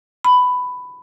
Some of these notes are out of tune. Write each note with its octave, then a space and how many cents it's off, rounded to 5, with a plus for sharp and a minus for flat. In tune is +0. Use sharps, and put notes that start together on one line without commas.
B5 +10